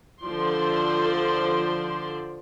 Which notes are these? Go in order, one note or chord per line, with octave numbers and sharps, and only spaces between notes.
D3 F3 C5 D5 C6